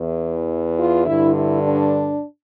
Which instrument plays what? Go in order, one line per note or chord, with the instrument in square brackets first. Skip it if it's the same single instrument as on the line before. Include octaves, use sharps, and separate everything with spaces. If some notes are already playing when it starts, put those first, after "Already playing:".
Already playing: [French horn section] E2 E3
F4
G2 D3 E4
E4
D4